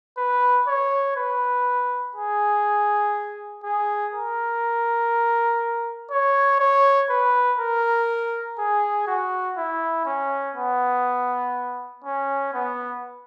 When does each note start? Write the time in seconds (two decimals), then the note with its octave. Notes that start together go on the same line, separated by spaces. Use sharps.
0.18 B4
0.68 C#5
1.16 B4
2.16 G#4
3.64 G#4
4.14 A#4
6.11 C#5
6.60 C#5
7.10 B4
7.59 A#4
8.59 G#4
9.07 F#4
9.57 E4
10.06 C#4
10.56 B3
12.05 C#4
12.54 B3